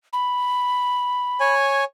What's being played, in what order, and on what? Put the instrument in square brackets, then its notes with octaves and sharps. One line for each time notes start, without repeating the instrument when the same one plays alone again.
[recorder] B5
[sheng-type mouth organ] C#5 G#5